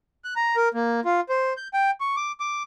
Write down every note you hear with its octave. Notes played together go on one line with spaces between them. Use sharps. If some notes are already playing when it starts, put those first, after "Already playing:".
F#6
A#5
A#4
A#3
F4
C5
G6
G5
C#6
D6
D6